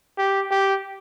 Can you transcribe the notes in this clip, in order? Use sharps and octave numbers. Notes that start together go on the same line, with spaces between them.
G4
G4